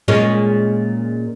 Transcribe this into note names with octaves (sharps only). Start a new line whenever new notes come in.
A#2 G#3 C#4